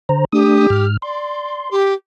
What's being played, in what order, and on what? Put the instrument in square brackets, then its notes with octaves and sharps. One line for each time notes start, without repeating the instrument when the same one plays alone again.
[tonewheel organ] D3 C5 A#5
[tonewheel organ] A3 D4 D#6 [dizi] G4
[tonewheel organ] G#2 F6
[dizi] D5 [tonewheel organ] C6
[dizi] G4